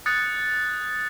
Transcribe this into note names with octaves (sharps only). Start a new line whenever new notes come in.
D#6 F#6 G#6 A6 C#7